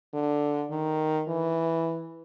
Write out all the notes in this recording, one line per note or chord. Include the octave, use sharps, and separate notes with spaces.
D3
D#3
E3